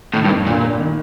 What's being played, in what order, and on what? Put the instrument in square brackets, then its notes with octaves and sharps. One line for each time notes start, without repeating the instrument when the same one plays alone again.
[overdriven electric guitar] A2 [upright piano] D#3
[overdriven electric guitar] G2
[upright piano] F2
[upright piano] G1 [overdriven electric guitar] A#2
[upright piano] G1
D#3